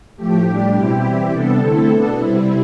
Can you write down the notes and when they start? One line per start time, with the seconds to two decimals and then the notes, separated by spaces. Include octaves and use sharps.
0.17 A2 F3 A3 G4
0.46 A2 G3 D4
0.73 B2 G3 C4 E4 G4
1.03 E3 G3 C4 E4
1.31 C3 G3 B3 D4 A4
1.59 D3 A3 C4 E4
1.89 B2 B3 D4
2.17 C3 G3 C4 E4